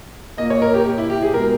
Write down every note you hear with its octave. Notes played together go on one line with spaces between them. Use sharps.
A#2 A#3 D#5
C#5
A#4
G4
G4
E4
G4
G#4
B2 G#3 A#4